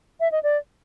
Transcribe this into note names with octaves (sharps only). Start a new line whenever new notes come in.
E5
D#5
D5